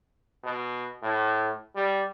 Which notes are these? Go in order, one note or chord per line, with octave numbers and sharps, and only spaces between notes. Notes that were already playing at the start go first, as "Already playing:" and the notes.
B2
A2
G3